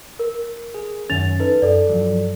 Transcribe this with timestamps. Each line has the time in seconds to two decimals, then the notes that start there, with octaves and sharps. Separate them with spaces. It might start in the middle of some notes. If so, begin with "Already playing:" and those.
0.19 A#4
0.75 G#4
1.10 F#2 D#3 C#4 A6 F7
1.40 D#4 A4 B4
1.62 F#2 A4 D5
1.90 G2 F3 F#3